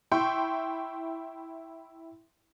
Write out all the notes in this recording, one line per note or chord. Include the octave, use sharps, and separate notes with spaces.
E4 G5 C6 C#6